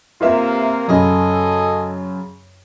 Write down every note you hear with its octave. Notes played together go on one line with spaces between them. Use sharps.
C3 A#3 F4 B4 E5
F#2 C#3 G#4 A4 D#5